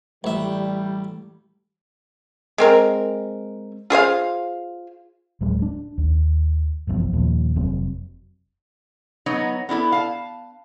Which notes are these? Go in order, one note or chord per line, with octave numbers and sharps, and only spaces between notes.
A1 G3 E5
G#3 C4 A#4
F4 G#4 C5 F5
D1 F#3 G#3
D4
D#2
F#1 B1 E2 F3
D#2 A#2 F3
F1 F#3 C4
F#3 B3 D#4 C#5
B3 D4 E4 A4
F5 A5